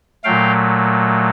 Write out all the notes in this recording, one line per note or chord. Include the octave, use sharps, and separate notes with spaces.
A#2 F#3 A3 F5 G5